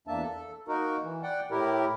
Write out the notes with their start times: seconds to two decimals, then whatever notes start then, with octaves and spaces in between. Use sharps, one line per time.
0.08 E2 A#3 D4 E5 A5
0.22 A4
0.68 A#3 D#4 F#4 A#4
1.03 E3
1.23 D5 F#5 G5
1.51 A2 E4 G4 A#4